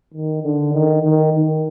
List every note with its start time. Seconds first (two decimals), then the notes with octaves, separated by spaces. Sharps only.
0.14 D#3
0.43 D3
0.73 D#3
1.03 D#3
1.32 D#3